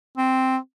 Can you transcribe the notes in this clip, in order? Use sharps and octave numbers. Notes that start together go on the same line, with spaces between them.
C4